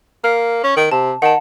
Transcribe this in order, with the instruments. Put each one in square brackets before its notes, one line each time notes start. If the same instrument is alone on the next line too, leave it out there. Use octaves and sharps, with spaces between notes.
[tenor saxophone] A#3 [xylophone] F6
[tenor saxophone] C#4
D#3
[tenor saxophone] C3 [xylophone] A5
[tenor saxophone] D#3 [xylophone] F#5 A5